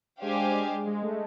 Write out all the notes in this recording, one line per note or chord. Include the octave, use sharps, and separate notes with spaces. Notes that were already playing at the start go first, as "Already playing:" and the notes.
G#3 D4 G4 C5 F5 G#5
G#3
G#3
A3